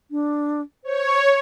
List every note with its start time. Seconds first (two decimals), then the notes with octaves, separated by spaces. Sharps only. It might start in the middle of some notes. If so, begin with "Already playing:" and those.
0.11 D4
0.84 C5 C#5